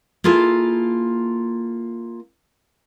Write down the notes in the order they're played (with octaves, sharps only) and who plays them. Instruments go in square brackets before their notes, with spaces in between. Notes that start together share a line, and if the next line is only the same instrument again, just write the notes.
[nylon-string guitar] A#3 E4 F4 G#4 A4